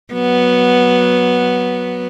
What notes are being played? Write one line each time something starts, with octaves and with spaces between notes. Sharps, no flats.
F#3 B3